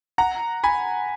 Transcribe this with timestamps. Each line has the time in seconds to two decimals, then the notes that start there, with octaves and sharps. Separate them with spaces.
0.18 F#5 A#5
0.64 G#5 B5